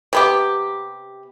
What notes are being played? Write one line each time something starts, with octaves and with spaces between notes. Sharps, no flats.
C3 B3 G4